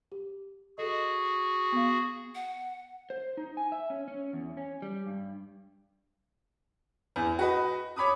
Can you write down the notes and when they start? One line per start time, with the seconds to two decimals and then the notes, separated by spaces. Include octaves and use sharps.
0.12 G4
0.78 F#4 G#4 A4 D#5
1.72 B3 F5
2.35 F#5
3.10 C5
3.37 D#4
3.57 G#5
3.72 E5
3.90 C#4
4.08 C#4
4.33 E2
4.57 C#4
4.82 G3
5.06 G2
7.16 E2
7.39 F#4 B4 D#5
7.96 C#5 B5 D6 D#6